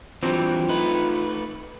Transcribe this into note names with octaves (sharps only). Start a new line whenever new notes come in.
E3 F#3 G3 C4 D4 F4 G5
A3 D#4 B4